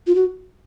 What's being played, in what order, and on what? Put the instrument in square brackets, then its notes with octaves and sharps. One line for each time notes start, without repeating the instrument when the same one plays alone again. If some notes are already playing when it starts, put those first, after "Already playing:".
[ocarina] F4
F#4